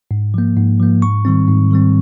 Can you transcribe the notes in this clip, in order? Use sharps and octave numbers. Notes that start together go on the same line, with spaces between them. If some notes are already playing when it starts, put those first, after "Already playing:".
G#2
F3 A#3
G#2
F3 A#3
G#2 C#6
D#3 G3 C4
G#2
D#3 G3 C4